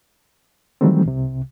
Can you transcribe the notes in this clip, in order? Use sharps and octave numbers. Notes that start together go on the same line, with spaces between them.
D#3 E3 F#3 G3 A3 C4
C2 C3